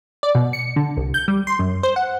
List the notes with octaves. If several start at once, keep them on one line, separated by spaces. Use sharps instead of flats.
D5
B2
C#7
D3
C2
G6
G3
C6
F#2
C5
F#5